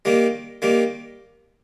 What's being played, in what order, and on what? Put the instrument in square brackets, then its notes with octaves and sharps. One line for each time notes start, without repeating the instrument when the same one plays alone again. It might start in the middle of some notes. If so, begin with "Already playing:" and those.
[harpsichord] D#3 G3 A#3
D#3 G3 A#3